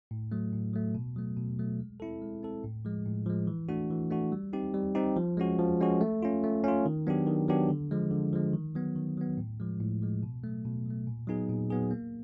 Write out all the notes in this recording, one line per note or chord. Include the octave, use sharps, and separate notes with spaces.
A2
F#3 A3
A2
F#3 A3
B2
F#3 A3
B2
F#3 A3
G#3
C4 E4 A4
G#3
C4 E4 A4
A2
F3 G#3
A2
F3 G#3
E3
A3 D4 F#4
E3
A3 D4 F#4
G3
C4 D#4 G4
G3
C4 D#4 G4
F3
G#3 C#4 F#4
F3
G#3 C#4 F#4
A3
C#4 F4
A3
C#4 F4
D#3
F#3 B3 D4 G4
D#3
F#3 B3 D4 G4
D3
F3 G#3
D3
F3 G#3
D#3
F#3 B3
D#3
F#3 B3
A2
F3 G#3
A2
F3 G#3
B2
F#3 A3
B2
F#3 A3
A#2
F#3 B3 D#4 G#4
A#2
F#3 B3 D#4 G#4
A#3